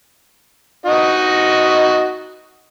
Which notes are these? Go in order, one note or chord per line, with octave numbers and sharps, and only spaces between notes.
D#4 F#4 D#5